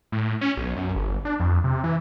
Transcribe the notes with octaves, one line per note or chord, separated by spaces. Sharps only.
A2
C#4
B1
F#2
G1
D4
F2
C3
E3